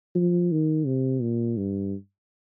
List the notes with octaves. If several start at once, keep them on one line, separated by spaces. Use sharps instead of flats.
F3
D#3
C3
A#2
G2